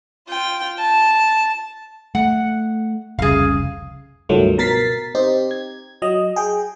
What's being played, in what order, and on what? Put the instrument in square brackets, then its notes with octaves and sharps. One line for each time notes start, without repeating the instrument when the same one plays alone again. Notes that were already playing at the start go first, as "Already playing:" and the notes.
[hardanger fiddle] F4 G5
A5
[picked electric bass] A3 [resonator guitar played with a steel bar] F#5
[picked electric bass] F1 C2 C#3 [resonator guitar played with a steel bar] G#4 F5
[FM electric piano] C#2 G2 D#3 F3 F#3 A3
B2 A#4 A6 B6 C7
C4 D#4 G4
G#6
F#3 D#5
G#4 G5